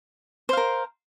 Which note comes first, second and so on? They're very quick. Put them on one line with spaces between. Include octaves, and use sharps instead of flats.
C5 F5 A#4